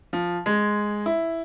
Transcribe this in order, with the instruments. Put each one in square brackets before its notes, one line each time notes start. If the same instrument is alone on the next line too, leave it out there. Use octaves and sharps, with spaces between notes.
[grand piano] F3
G#3
E4